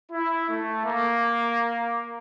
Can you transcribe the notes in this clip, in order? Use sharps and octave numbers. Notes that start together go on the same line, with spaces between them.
E4
A3
A#3